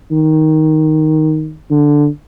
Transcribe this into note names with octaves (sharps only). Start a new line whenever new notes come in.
D#3
D3